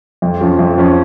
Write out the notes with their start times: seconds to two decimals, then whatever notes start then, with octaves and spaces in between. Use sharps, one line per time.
0.22 F2
0.41 F3 C#4
0.59 F2
0.78 F3 C#4